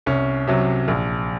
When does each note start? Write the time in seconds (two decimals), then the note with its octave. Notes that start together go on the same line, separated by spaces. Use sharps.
0.06 C2 C#4
0.47 C3 F#3
0.88 A#1